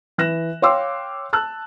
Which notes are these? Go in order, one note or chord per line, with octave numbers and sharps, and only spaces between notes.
E3 F#6 A#6 E7
C#5 F5 G5 C6 D6 E6
A5 E6 F#6